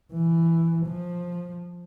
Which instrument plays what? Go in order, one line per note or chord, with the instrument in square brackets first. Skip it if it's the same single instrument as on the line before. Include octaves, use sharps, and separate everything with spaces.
[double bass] E3
F3